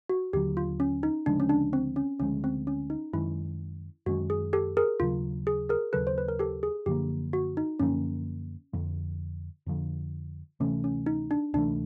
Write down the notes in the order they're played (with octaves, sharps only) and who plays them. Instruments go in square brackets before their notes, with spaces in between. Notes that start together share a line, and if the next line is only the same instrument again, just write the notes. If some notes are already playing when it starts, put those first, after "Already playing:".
[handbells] F#4
[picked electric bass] D#2 D3 F#3 [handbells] G4
[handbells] F4
C#4
D#4
[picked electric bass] D2 C#3 F3 G#3 [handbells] D4
[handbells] C#4
D4
C4
C#4
[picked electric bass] D2 C#3 F3 G#3 [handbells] C#4
[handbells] C4
C#4
D#4
[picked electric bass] F#2 D#3 G#3 C#4 [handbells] E4
[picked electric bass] F#2 D#3 G#3 C#4 [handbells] F#4
[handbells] G#4
G4 A4
G#4 A#4
[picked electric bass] D#2 C#3 F#3 [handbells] F4
[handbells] G#4
G#4 A#4
[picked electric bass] D#2 C#3 F#3 [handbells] A4 B4
[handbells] C5
B4
A#4
G4 A4
G#4
[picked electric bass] F#2 D3 F3 A#3 [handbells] G4
[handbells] F#4
D#4
[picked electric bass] F#2 D3 F3 A#3 [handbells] C#4
[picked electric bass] F2 D3 F3
F2 D3 F3
[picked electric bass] D2 C3 E3 A3 [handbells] C#4
[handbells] C#4
D#4
D4
[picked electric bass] D2 C3 E3 A3 [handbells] D4